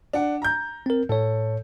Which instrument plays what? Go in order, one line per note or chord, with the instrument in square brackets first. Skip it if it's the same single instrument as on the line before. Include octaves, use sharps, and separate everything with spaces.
[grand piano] D4 F#5
A#5 G6
[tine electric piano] C4 A#4
[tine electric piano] A2 C#5 [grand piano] A4